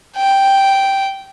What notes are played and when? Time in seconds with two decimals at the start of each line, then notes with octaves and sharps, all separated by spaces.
0.16 G5